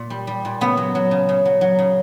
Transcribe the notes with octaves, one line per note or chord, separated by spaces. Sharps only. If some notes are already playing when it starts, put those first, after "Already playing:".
Already playing: A#2
G3
G3
A#2
C#3 B3
F#3
F#3
C#3
C#3
F#3
F#3
C#3